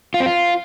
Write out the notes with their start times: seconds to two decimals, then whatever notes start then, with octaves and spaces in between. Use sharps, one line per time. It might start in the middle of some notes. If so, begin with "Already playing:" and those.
0.14 F4
0.20 C4
0.26 F4